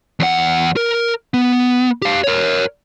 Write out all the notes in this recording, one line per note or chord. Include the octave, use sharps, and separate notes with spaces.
E2 F#5
A#4
B3
G4 F5
A#4 C#5